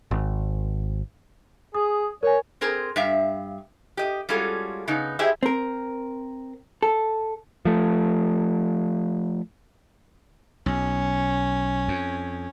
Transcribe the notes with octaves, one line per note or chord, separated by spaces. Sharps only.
G#1
G#4 D#6
A#4 C#5 G#5
C4 G#4 A#4 C5
G2 E5 F5
G4 D#5
G3 G#3 C#4 F4 F#4 A4
C#3 B3 D#4
E4 G4 G#4 C5 D#5 E5
C4 A#4
A4
F3 A3
B1 C#4
F2